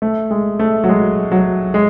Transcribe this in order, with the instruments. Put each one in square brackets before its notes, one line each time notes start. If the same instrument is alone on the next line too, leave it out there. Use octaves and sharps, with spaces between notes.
[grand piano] A3
G#3
A3
F#3
G#3
F#3
G#3